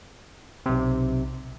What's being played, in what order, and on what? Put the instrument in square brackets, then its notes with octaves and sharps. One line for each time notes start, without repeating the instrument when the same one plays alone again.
[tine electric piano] B1 C3